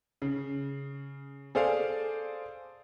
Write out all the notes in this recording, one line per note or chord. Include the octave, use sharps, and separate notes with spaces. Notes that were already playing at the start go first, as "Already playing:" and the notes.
C#3
G#4 A4 C5 D5 F5